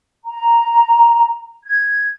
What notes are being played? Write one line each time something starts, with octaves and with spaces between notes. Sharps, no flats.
A#5
G#6